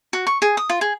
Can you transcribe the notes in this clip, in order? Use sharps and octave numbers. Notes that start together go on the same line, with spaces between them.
F#4
C#6
G#4
D#6
F4
G#4